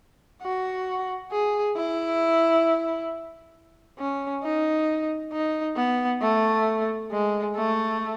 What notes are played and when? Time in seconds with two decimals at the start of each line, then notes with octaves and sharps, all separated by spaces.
0.42 F#4
1.32 G#4
1.76 E4
3.99 C#4
4.43 D#4
5.33 D#4
5.77 B3
6.22 A3
7.11 G#3
7.56 A3